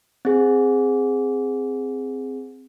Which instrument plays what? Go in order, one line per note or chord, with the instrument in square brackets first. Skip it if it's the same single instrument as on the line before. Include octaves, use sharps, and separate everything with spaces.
[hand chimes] C4 G#4